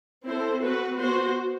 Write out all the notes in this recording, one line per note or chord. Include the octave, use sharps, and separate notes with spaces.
C4 E4 A4 C5
C4 F#4 B4
B3 F#4 C5